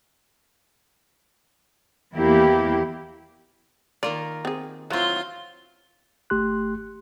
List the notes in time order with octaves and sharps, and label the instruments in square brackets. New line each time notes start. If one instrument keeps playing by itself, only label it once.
[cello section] E2 A#3 E4 G4
[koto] D#3 A#3 F4 [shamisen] D5
[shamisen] C4 G#4
[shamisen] E3 [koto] F#3 C4 [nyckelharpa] F4 C6
[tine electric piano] G1 A3 G4 C6 F#6